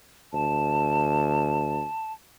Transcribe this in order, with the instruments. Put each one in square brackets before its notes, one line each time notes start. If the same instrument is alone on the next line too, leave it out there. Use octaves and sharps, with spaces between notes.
[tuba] D2 [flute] A5